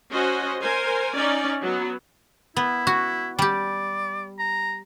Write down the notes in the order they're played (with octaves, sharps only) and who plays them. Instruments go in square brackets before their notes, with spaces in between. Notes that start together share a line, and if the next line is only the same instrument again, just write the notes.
[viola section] C#4 F#4 C5 D#5
A#4 C5 G#5
C#4 D#4 D5
F#3 B3
[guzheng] B3 [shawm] E4
[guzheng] F#4
[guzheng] G3 G4 [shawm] D5
[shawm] A#5